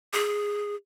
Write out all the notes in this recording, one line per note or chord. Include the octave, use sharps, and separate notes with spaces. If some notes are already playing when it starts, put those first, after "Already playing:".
G#4